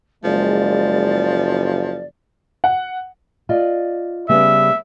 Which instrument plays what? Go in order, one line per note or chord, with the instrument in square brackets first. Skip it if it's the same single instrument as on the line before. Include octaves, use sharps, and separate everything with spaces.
[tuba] F#1 [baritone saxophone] F3 [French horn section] G#3 [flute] D5
[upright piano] F#5
[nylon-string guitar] F4 D5 D#5
[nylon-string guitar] C#3 G3 B3 [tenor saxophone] E5